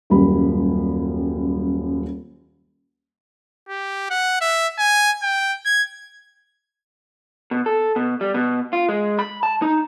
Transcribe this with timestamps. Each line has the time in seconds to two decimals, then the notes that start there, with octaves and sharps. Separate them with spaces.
0.10 D#1 F#2 G3 B5
3.69 G4
4.10 F#5
4.41 E5
4.78 G#5
5.22 G5
5.65 G#6
7.51 B2
7.66 A4
7.96 B2
8.21 G3
8.34 B2
8.73 F4
8.89 G#3
9.19 B5
9.43 A5
9.62 D#4